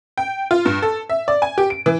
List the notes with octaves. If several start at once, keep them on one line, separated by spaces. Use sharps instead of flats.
G5
F4
G2
A4
E5
D5
G#5
G4
D7
E3